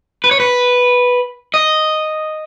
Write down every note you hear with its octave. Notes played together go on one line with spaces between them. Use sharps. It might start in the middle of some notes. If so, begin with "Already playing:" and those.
B4
C#5
B4
D#5